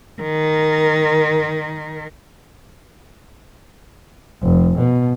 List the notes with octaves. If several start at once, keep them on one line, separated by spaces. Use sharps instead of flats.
D#3 A#4
F1
B2